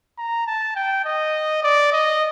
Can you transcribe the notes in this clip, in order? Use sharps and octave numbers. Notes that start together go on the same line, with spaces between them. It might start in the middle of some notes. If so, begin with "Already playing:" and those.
A#5
A5
G5
D#5
D5
D#5